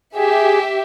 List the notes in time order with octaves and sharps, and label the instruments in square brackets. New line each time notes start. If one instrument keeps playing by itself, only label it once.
[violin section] G4 E5 [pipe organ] G#4